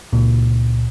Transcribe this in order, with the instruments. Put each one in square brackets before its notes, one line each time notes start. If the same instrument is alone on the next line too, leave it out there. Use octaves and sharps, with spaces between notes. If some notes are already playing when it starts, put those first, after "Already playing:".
[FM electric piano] C#2 A#2